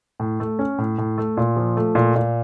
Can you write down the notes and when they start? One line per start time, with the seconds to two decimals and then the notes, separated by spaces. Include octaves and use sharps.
0.20 A2
0.40 A3
0.59 C#4
0.78 A2
0.98 A2
1.18 A3
1.37 A#2
1.56 F3
1.77 A3
1.95 A#2
2.16 A#2